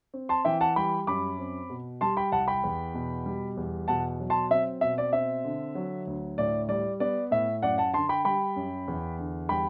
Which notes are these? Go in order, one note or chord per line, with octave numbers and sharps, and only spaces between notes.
C4
A5 C6
E3 E5 G5
F#5 A5
G3 G5 B5
F#2 B5 D6
C4
B2
G3 A5 C6
G5 B5
C2 F#5 A5
G5 B5
E2
B2
G3
E2
B2 F#5 A5
F#3
A5 C6
C4 E5
B2 E5
D5
C4 E5
D3
F#3
D2
A2 D5
G3 D5
B3 D5
A2 E5
F#2 D5 F#5
F#5 A5
D3 A5 C6
G5 B5
G3 G5 B5
F#2
E2
D3
G3 G5 B5